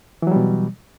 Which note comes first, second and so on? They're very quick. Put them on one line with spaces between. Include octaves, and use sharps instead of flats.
E3 F#3 G3 B2